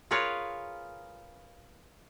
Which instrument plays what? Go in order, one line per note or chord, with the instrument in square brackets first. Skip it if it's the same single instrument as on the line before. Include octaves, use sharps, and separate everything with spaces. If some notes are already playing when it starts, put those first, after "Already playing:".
[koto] F4 G#4 A#4 B4 C#5 F5